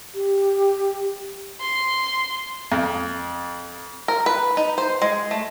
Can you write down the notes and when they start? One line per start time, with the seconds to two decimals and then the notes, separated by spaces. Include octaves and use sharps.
0.15 G4
1.61 C6
2.72 F2
4.08 A#4
4.26 B4
4.57 D#4
4.78 C5
5.02 G#3
5.31 A3